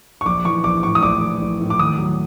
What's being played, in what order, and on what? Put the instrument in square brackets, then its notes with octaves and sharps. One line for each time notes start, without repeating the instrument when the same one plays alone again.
[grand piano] C#6
A#1 D6
E3 C#6
A#1 D6
A2 C#6
D#6
A#1 D6
E3
A#1
A2
D6
D#2 D#6
F#3